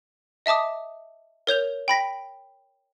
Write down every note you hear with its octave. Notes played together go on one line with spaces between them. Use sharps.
D#5 E5 A5 D6 D#6
A#4 C#5 G6 F7
G5 B5 A#6 B6